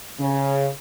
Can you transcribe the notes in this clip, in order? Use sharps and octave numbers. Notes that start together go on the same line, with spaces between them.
C#3